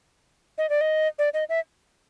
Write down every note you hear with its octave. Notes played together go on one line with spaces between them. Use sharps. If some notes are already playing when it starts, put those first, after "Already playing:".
D#5
D5
D#5
D5
D#5
E5